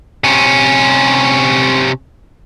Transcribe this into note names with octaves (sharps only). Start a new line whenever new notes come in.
C3 C#4